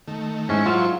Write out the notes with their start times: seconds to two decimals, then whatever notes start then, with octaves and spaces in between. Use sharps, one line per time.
0.08 D#3 A3
0.49 G#2 C#4 E4 C5 C#6
0.66 F#3 F4